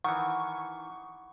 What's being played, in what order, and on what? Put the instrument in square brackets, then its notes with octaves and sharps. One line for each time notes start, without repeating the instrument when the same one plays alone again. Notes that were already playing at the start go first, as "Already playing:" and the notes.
[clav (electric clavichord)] D#3 E3 [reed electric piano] F#5 [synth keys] C#6